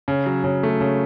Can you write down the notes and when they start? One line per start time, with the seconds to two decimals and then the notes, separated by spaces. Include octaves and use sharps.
0.08 C#3
0.26 F#3
0.44 C#3
0.63 A3
0.81 C#3